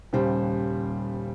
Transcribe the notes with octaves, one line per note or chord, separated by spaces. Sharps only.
D#1 C#3 G3 C5